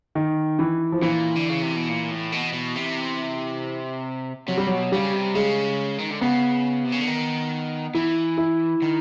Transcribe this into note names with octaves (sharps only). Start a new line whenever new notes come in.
D#3
E3
F3
A#2 E3
D3
C#3
C3
B2
A#2
A2
B2
B2
C3
C3 F#3
G3
B2 F#3
C#3 G3
C3
C#3 G#3
D#3
D3
C#3 B3
C3
C#3
D3
D#3
E3 E4
E4
D#3